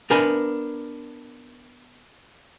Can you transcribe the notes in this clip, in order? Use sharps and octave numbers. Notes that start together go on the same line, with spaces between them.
B3 D4 A#4 B4 G#5